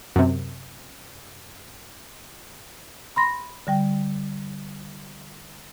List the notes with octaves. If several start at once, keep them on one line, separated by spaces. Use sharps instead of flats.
F#2 C3
B5 C6 A#6
D3 G3 G5